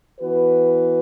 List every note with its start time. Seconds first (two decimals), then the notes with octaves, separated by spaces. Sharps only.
0.20 E3 B3 F#4 B4